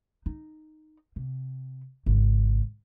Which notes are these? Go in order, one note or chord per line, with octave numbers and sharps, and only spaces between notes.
D#4
C3
G#1 C#3